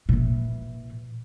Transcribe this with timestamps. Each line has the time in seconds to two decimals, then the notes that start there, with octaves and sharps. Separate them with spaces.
0.09 A#2 E3